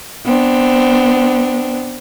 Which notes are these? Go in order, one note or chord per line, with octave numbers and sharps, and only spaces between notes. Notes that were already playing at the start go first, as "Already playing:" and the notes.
B3 C4 D4